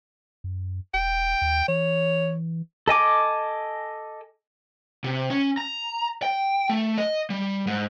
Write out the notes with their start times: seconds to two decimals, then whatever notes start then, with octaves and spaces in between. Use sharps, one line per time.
0.44 F#2
0.94 E1 G5
1.42 D#2
1.68 E3 C#5
2.88 A4 D#5 G#5 D6
5.04 C3
5.30 C#4
5.57 A#5
6.22 G5
6.69 A3
6.98 D#5
7.30 G3
7.67 G#2